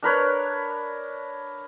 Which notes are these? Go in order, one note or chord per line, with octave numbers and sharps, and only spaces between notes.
D4 A#4 B4 C#5